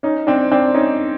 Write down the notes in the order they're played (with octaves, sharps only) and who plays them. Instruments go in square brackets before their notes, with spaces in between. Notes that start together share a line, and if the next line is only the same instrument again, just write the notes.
[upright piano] C#4 D#4
C4 D4
C4 D4
C#4 D#4